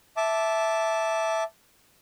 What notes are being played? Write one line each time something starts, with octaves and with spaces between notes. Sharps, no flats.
E5 A5 D6